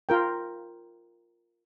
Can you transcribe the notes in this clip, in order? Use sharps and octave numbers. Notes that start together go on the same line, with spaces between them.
F4 A#4 G5